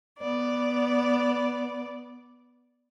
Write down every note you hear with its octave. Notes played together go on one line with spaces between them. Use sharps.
B3 D5